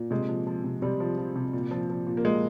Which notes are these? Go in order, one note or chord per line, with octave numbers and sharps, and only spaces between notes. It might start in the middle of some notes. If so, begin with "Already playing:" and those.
Already playing: A#2
C3 G#3
F3
F3
C3
C3 G3
F3
F3
C3
A#2
F3
F3
A#2
A#3
A#2 G#3